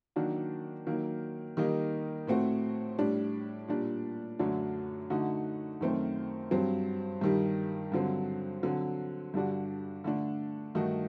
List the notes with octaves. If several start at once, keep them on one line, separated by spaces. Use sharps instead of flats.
D#3 F#3 A#3 D4 F#4
D#3 F#3 A#3
D#3 G3 A#3 D#4
A2 A3 C4 F#4
A2 G3 D4
A#2 G3 D4
F#2 D3 F#3 A3 D4
D3 A3 D#4 F#4
F#2 D#3 A3 C4
G2 F#3 C4
G2 D#3 G3
G2 D3 F#3 C4
D3 F#3 C4
G2 D3 G3 D4 F#4
D3 A3 D4
G2 D#3 A3 D#4 F#4